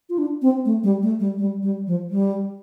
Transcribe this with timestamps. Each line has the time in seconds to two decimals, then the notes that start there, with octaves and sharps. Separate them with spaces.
0.10 F4
0.18 D4
0.42 C4
0.65 A3
0.84 G3
1.03 A3
1.20 G3
1.38 G3
1.62 G3
1.87 F3
2.10 G3